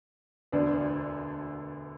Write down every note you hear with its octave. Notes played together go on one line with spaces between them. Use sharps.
E1 D2 D3 B3 D4